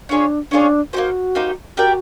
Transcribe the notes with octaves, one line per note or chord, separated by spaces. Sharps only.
C#4 D4 F4 G#4 C#5
C#4 D4 F4 G#4 C#5
A#3 D#4 F#4 G4 C5
A#3 D#4 G4 C5
F#4 G4 A#4 D5 G5